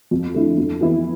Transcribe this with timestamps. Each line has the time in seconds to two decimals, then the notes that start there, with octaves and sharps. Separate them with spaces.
0.11 F2
0.34 D3 A3 E4
0.58 F2
0.81 E3 B3 E4